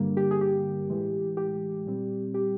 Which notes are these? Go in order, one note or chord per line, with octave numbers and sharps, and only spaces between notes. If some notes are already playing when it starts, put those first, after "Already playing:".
Already playing: G2 D3 G3 A#3
G4
G#4
G4
A2 E3 G#3
G4
A#2 G3 C4
G4